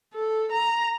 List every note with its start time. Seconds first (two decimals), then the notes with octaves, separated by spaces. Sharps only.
0.14 A4
0.52 A#5